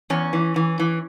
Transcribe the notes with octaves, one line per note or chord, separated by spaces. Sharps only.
E2 C#4
E3
E3
E3